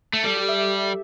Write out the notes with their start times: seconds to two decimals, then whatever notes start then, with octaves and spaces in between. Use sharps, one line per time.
0.13 A3
0.24 G3 A4
0.36 G4
0.49 E5